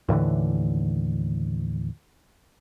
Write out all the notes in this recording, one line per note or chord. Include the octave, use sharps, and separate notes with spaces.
D#2 A2 D3 E3